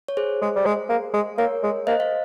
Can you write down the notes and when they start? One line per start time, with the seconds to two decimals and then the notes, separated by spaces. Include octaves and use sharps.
0.08 C#5
0.17 G#4 C5
0.42 G#3
0.56 G3
0.66 G#3
0.89 A#3
1.14 G#3
1.38 A#3 A#4 C#5
1.63 G#3
1.87 A#3 C5 D#5
2.00 F5